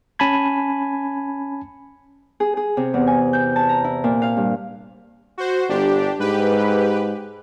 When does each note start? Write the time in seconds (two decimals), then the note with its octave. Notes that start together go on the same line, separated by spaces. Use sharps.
0.19 C#4 G#5 A5 B5 G#6
2.40 G#4
2.57 G#4
2.77 C3
2.94 E2
3.07 G#5
3.33 G6
3.56 A5
3.69 A#5
3.84 E4
4.04 A#2
4.22 F5
4.37 G2
5.38 F#4 C5
5.69 G1 D4 G4
6.20 G#2 G4 B4